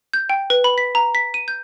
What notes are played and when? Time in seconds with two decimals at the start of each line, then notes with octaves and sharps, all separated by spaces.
0.13 G6
0.30 G5
0.50 B4
0.64 B5
0.78 B6
0.95 A#5
1.15 B6
1.34 D#7
1.48 G6